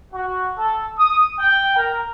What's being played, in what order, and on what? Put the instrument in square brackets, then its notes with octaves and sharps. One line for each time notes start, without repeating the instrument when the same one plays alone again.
[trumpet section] F#4
A4
D#6
G5
A#4